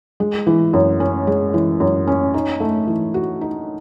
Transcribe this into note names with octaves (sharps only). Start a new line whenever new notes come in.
G#3
E3
F#2
C#4
G#3
E3
F#2
C#4
D#4
A3
E3
F#4
D#4